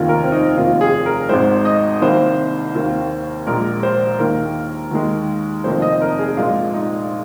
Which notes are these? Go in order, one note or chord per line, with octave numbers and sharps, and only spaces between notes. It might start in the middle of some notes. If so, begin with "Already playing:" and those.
Already playing: F1 D#2 D#3 F4
A#4
C4
D#4
F1 D#2 D#3 A#3 F4
G#4
A#4
G#1 G#2 G#3 C5
D#5
C2 C3 D#3 A#3 C5
D#2 D#3 A#3
A#1 A#2 G#3 A#4
C5
D#2 D#3 A#3 A#4
D#2 D#3 G#3
F1 F2 D#3 A#3 C5
D#5
A#4
G#4
A#1 A#2 G#3 F4
D#4